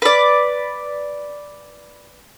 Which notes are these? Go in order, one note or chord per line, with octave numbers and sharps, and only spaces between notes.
B4 D5